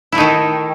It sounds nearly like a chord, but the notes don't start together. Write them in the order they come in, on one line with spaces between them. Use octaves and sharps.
E4 A3 D#4 D#3